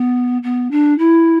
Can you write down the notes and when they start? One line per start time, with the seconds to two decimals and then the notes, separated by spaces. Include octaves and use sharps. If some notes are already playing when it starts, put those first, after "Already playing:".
Already playing: B3
0.43 B3
0.71 D4
0.98 E4